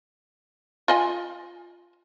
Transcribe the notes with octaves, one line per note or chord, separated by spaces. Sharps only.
F4 D#5 G#5